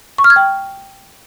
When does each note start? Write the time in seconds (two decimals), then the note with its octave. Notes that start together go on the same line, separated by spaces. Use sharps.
0.18 C#6
0.24 F6
0.30 G#6
0.36 G5